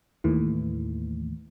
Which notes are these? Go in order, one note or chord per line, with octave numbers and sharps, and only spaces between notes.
D#2 A2 E3